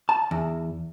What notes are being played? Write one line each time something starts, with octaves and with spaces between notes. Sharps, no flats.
A5
E2